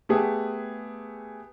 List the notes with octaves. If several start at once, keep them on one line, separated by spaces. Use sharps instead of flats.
A3 B3 G4 G#4